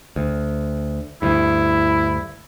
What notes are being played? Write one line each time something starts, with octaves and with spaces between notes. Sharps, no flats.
D2
D2 G2 E4